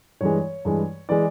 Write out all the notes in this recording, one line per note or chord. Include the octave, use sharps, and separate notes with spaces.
G2 E3 G#3 C#5
G2 E3 G#3
E3 G#3 D5